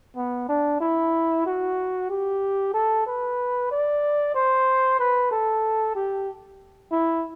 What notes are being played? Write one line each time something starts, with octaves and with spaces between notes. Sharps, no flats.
B3
D4
E4
F#4
G4
A4
B4
D5
C5
B4
A4
G4
E4